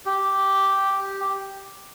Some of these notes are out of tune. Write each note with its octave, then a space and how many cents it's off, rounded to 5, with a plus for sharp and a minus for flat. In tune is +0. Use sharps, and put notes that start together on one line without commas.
G4 -5